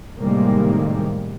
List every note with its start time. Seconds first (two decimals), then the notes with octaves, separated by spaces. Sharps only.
0.17 A2 C3 D#3 G3 G#3 A#3